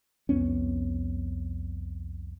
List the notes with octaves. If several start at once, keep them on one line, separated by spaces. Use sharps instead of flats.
C2 F2 B3 C#4